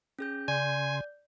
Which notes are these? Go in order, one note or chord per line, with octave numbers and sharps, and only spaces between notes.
C#4 G#4 G6
C#3 D5 G#5 C6 G6 G#6